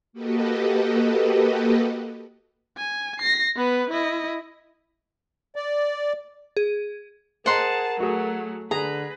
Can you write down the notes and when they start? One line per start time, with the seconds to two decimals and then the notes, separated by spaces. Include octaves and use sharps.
0.13 A#3 F#4 G4 A4 B4 D#5
2.77 G#5
3.19 A#6 C7
3.56 B3 B4
3.91 E4 D#5
5.56 D5
6.57 G#4
7.46 G#4 A#4 C5 D#5 F#5 A5 A#5 C6
8.00 F#3 A3 F#4 G#4
8.71 D3 G#4 B4 A#5